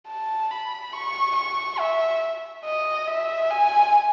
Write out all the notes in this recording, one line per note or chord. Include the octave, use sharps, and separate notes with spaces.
A5
B5
C#6
C#6
E5
D#5
E5
G#5